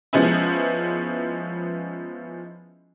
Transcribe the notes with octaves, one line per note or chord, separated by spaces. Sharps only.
F3 G#3 B3 C#4 D#4 E4